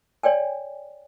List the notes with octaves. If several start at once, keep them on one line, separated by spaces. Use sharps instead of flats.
C#5 D5 G5 G#5